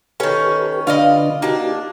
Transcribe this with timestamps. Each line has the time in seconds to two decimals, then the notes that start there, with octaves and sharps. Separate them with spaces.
0.20 D#3 C#4 G4 A4 B4
0.87 D3 D4 F4 B4 D5 D#5
1.42 A#3 D4 D#4 F#4 G4